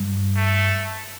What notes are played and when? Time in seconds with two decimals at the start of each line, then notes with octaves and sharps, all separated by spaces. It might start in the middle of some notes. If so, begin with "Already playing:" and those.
Already playing: G2
0.36 A3